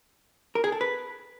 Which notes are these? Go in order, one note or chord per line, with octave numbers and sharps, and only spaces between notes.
A#4
G#4
A4
B4